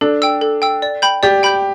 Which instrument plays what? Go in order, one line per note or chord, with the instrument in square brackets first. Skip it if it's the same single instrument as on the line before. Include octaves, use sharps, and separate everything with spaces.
[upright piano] D4 [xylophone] A4
[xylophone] G5 E6
A4
G5 E6
D5
G5 B5 G6
[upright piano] G4 [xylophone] D5
[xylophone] G5 B5 G6